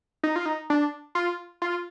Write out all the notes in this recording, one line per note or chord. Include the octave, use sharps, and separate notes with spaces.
D#4
F4
D#4
D4
F4
F4